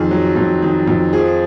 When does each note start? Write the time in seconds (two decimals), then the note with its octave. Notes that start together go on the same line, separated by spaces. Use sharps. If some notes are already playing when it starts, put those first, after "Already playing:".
Already playing: F2 D#3 G#4
0.11 F#3
0.36 F2
0.62 D#3
0.88 F2
1.13 F3 G#4